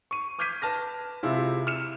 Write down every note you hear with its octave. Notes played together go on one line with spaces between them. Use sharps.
C#6 D#7
D6 F6 G6 G#6 B6 D#7
B4 A5 F6 A#6
C3 G#3 E4 F4
F6 C#7 E7